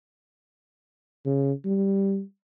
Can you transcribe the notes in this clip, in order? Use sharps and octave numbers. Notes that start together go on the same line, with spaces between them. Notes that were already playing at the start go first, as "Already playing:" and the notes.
C#3
G3